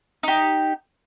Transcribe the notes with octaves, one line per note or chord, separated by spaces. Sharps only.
D#4 G4